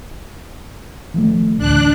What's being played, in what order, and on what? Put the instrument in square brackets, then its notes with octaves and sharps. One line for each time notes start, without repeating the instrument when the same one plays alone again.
[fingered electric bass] D#3 F3 A3
[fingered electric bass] A1 D2 [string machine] D4 F#6